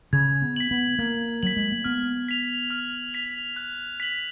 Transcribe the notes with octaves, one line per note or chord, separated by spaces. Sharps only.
C#3 G#6
B3
B6 F#7
B3
A#3 G#6
F#3 B6 F#7
G#3
A#3
B3 F6
B6 F7
F6
B6 F7
F#6
B6 F#7